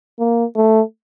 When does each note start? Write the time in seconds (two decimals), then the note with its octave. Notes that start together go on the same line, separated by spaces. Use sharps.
0.19 A#3
0.56 A3